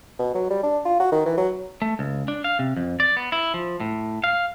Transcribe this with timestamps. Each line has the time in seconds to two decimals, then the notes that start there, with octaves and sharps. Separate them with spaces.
0.19 B2
0.35 F#3
0.50 G3
0.63 D4
0.86 F4
1.00 F#4
1.12 D#3
1.26 E3
1.38 F#3
1.82 A3
1.99 C#2
2.28 D4
2.44 F5
2.59 C3
2.77 F2
3.00 D5
3.17 B3
3.32 E4
3.54 F3
3.80 A2
4.24 F5